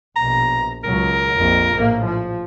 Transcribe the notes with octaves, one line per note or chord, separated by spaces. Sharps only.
A#1 B2 A#5
C#2 F#3 A#4
A#1 F2
A#1 A2 A#3
F3